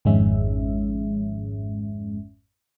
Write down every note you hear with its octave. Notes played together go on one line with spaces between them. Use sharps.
G#1 F2 G#2 G#3 C#4 E5